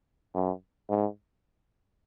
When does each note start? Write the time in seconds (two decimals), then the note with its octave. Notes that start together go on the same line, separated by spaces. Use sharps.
0.34 F#2
0.89 G#2